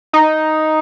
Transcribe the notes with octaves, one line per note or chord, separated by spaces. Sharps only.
D#4